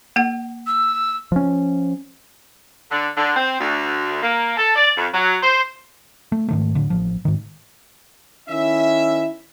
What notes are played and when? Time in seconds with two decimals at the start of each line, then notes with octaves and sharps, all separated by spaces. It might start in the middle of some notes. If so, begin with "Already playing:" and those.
0.16 A#3 F#5
0.67 E6
1.32 F3 C#4
2.90 D3
3.15 D3
3.35 C4
3.58 D2
4.22 A#3
4.56 A4
4.75 D5
4.96 F2
5.13 F#3
5.41 C5
6.32 A3
6.49 G#2 D#3 A3
6.75 A2 D3
6.90 A1 F3
7.25 G#2 D#3
8.49 D#3 C#4 E4 E5